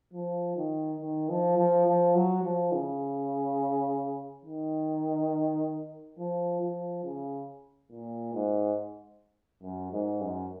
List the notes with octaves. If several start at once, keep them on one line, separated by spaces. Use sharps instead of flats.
F3
D#3
D#3
F3
F3
F3
F#3
F3
C#3
D#3
F3
F3
C#3
A#2
G#2
F#2
G#2
F#2